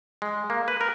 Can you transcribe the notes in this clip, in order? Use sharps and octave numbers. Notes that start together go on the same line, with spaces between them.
G#3
A#3
B4
A#4